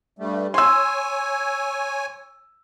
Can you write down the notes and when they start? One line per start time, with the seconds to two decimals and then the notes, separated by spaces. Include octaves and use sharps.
0.19 G2 G3 A3
0.54 C#5 G#5 C6 E6